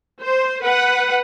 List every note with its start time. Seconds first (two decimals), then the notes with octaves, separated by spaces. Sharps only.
0.21 C5
0.62 B4 F#5